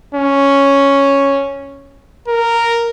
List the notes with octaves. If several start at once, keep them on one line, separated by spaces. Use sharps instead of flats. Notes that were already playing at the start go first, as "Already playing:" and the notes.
C#4
A#4